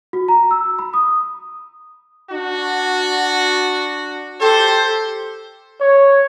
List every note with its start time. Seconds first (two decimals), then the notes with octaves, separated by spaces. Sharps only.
0.13 F#4
0.28 A#5
0.51 E6
0.79 B5
0.94 D#6
2.31 D4 F#4
4.41 G4 A4 C5
5.80 C#5